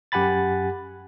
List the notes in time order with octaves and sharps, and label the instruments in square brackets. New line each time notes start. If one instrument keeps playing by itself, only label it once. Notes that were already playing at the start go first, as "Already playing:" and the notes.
[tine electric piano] F#2 G4 F#5 G#5 B5 A6